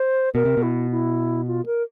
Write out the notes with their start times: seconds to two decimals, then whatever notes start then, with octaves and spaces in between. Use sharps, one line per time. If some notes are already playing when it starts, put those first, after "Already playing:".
Already playing: C5
0.35 B2 A#4
0.45 C3
0.57 B2
0.63 E4
0.91 E4
1.47 F4
1.66 A#4